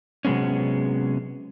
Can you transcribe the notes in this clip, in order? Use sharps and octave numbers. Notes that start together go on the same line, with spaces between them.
C3 F#3 G#3 B3 C#4